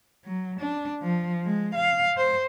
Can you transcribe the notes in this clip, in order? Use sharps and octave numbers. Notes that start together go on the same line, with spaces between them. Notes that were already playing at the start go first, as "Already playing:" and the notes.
F#3
D4
F3
G#3
F5
C5